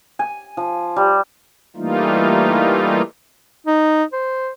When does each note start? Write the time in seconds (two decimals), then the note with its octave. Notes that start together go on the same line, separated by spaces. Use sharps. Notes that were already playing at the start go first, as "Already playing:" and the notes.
0.19 G#5
0.57 F3
0.96 G3
1.76 E3 G3 A3 A#3 D#4 F4
3.66 D#4
4.12 C5